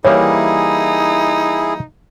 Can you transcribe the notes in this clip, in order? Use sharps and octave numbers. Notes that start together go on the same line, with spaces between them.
E3 G3 A#3 D#4 E4 G#4 C#5